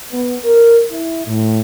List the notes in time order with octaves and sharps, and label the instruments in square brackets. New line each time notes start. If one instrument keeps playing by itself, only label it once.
[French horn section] B3
A#4
E4
A2